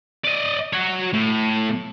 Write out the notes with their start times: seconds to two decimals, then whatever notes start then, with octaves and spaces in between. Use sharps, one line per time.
0.24 D5 D#5
0.73 F#4 C#5
1.13 A2